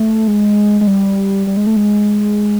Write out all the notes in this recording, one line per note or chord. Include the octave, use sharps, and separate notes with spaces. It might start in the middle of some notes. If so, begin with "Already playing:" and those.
Already playing: A3
G#3
G#3
G3
G3
G#3
A3
G#3